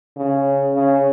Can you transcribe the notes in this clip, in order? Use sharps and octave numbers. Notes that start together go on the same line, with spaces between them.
C#3
C#3